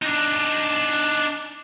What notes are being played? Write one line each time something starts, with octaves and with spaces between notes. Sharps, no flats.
D4 D#4